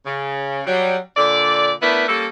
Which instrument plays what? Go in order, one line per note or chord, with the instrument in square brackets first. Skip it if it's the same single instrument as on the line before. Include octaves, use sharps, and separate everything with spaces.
[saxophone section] C#3
F#3 G3
A#2 D3 A4 D5
A3 B3 D4 E4 A#4 B4
G3 A#3 C#4 A4